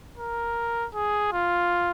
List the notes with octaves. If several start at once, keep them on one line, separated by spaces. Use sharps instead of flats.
A#4
G#4
F4